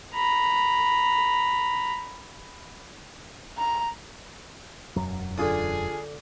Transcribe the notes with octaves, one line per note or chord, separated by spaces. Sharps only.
A#5 B5
A#5
E1 F#2 F#3
D3 D4 F4 G#4 D#6